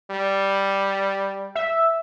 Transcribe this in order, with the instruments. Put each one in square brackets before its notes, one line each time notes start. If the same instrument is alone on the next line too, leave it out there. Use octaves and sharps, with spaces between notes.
[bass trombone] G3
[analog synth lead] E5